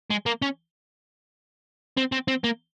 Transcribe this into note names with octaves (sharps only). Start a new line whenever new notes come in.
G#3
A#3
C#4
C4
C4
C4
A#3